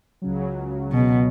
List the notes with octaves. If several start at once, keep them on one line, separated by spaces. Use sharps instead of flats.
C#2 C#3 F#3
B2